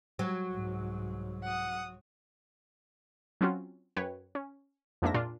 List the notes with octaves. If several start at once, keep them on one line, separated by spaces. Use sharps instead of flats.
F#3
C2 G#2
F#5 D#6
F#3 C4 C#4 F4 F#4
F#2 B4 C#5 G5
C#4
F2 G#2 A#3 D4 E5 A#6
A#2 D4 F4